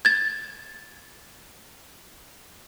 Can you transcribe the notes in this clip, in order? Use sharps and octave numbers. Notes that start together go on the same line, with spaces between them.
G#6 A6